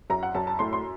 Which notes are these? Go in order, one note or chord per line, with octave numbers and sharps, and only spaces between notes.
F#2 A#5
F#5
F#2 A5
A5
A2 C6
C6